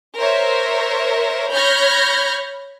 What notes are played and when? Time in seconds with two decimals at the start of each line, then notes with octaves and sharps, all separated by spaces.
0.18 A#4 C5 C#5 E5
1.51 C#5 B5 F6 G6 G#6 A#6